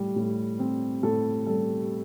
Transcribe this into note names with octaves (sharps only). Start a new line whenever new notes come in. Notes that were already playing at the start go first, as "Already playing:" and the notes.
Already playing: A2 G3
A2
C4
A2 A4
G3 A4